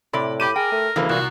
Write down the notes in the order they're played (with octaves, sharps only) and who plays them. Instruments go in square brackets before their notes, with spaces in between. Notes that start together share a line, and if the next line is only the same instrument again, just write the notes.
[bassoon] A2 [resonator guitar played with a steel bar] C3 D5 [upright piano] B5
[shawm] G4 [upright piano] B5 D6 D#7
[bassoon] G#4 [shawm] A#4 [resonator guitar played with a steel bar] G5
[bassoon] A3
[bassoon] D2 [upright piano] C#3 [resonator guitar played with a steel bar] E3 G#3 A#3
[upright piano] C2 [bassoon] A#2 [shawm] F#4